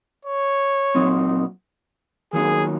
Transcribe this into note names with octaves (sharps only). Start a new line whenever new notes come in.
C#5
A#2 F#3 C4 D#4
D#3 F#3 A#3 D#4 G#4